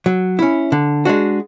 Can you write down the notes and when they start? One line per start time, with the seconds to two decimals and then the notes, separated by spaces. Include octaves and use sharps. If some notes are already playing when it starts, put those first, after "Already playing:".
0.06 F#3
0.39 C#4 E4
0.72 D3
1.05 G#3 D4 F#4